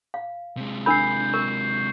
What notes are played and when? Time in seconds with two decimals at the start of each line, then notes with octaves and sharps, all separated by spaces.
0.14 F5
0.57 C3 G#3
0.86 D4 A#4 B5 G6 C7
1.34 A#4 C#6